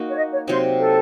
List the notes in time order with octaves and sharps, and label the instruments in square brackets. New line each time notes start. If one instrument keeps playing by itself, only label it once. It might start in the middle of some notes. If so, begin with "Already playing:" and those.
Already playing: [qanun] A#3 D#4 F#4
[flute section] C#5
D#5
C#5
[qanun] C3 F#3 C4 D#4 [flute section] C5
[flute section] A4